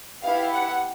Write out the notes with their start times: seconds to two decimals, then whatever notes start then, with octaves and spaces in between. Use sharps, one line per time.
0.23 B3 E4 G4 F5
0.51 F#5